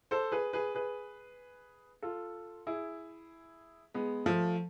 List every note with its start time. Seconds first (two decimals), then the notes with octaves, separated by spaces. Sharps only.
0.11 A4 C5
0.32 G#4 B4
0.53 G#4 B4
0.75 G#4 B4
2.02 F4 A4
2.67 E4 G#4
3.94 G#3 B3
4.26 F3 A3